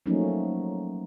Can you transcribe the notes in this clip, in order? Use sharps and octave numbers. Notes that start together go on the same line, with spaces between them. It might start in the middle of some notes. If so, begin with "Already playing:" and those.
F3 F#3 A3 A#3 C#4 D#4